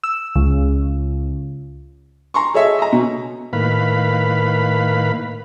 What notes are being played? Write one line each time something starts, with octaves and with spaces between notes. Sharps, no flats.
E6
C#2
A#5 C6 C#6
G#4 A4 C#5 D#5 E5
D#5 A#5
B2
A2 D#3 A#3 B4 F5 B5